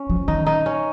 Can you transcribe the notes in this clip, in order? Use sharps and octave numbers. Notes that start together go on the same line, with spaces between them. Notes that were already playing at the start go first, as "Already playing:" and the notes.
Already playing: C#4
F3
D#3 D#4
D#4
C#4